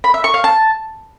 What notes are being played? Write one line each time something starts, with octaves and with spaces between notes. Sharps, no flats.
B5
E5
C#6
F5
A5